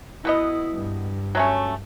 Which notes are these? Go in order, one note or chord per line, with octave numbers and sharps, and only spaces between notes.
B2 B3 E4 D#5
G2
F#3 A3 C#4